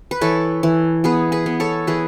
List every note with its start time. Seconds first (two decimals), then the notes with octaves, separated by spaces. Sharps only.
0.11 B4
0.21 E3 A4 C#5
0.63 E3
1.04 B3 G#4 B4
1.32 G#4 B4
1.46 B3
1.60 A4 C#5
1.87 E3 G#4 B4